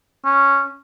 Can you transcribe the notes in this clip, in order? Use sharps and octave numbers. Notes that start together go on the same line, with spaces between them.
C#4